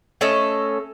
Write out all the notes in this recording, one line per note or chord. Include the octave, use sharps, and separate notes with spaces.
A3 C#4 A4 D#5